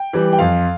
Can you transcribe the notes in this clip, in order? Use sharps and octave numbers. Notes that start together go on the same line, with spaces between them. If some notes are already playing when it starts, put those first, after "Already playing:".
Already playing: G5
E3 G3
G5
F2 F5